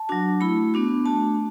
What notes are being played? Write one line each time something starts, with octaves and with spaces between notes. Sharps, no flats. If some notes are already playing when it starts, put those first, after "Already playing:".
Already playing: A5
F#3 D4 F#4
A3 E4 B5
B3 D4 F#4
A3 D4 F#4 A5